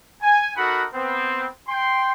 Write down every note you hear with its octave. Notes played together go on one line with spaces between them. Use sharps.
G#5
D#4 F#4 A4 A#4 F#5 B5
B3 C4
G5 C6